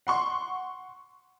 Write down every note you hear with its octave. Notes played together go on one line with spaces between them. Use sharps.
F#5 C6 C#6